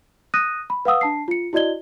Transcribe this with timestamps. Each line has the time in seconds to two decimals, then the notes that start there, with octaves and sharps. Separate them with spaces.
0.34 D#6 F#6 A#6 D#7
0.70 B5
0.85 B4 F5 F#5 D#6 E6
1.01 D4 A5 C7
1.28 F4 C#7
1.53 E4 F#4 D5 D#5 G#6 G7